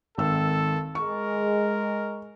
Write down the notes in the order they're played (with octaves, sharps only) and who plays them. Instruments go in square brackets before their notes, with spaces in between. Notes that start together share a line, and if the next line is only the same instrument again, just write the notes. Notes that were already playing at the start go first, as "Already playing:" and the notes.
[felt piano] G#1 D#3 E6 [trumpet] A4
[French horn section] G#3 [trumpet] A#4 [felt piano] C#6